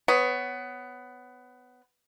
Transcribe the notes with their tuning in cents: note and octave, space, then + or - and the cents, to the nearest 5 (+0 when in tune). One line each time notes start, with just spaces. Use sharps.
B3 +15 C#5 +0